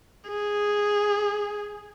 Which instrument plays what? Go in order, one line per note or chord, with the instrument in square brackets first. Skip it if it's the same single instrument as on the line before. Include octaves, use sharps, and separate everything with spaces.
[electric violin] G#4